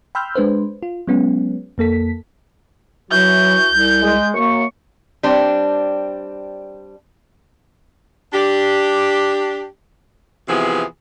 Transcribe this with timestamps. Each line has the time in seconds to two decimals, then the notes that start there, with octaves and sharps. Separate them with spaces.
0.15 G5 B5 C6 E6 F6 G6
0.35 G#3 D4 B4 C5
0.83 F4
1.07 F#3 G#3 B3 C#4
1.78 F2 A#3 A4 B6
3.11 E3 F#3 E4 F#4 G6
3.70 C2
4.01 G#3
4.34 F#2 A#3 C#6
5.23 G3 C4 D4
8.34 D4 G4
10.48 C3 E3 F3 B3 G#4